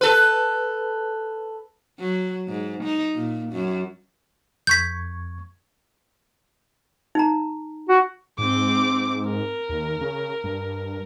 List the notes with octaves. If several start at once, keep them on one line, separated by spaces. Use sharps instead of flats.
A4 B4
F#3
G#2
D#4
A#2
F#2
F2 C#6 G6 G#6 B6
D#4 A#5
F#4
G#2 C4 D6
A#4
D#2
C#3
G2